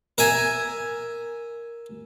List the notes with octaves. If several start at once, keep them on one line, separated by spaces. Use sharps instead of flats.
A#4 E5 G#5